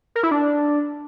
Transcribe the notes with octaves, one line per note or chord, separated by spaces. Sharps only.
A#4
E4
D4